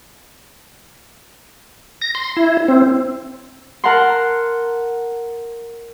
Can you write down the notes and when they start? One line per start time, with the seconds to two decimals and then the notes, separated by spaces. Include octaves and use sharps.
2.02 A#6
2.15 C6
2.37 E4
2.68 C4
3.84 A#4 F#5 A5 A#5 C6